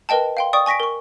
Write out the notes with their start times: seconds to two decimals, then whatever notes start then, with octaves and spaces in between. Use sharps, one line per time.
0.09 A#4 B4 D#5 G5 A5
0.37 F5 G5 C6
0.53 D5 G5 C#6 D#6
0.66 G#5 C#6 A#6 B6 D7
0.80 A#4 C#6